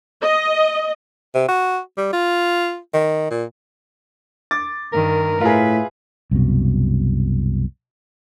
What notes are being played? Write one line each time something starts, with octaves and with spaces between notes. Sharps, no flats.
D#5
C3
F#4
G3
F4
D#3
A#2
D6 A6
G2 D#3 A#4
A2 F4 G#4 B4 E5
C2 F#2 B2